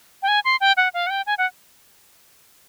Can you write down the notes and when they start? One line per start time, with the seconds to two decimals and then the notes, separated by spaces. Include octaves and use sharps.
0.23 G5
0.28 G#5
0.45 C6
0.61 G5
0.77 F#5
0.94 F5
1.07 F#5
1.10 G5
1.27 G#5
1.38 F#5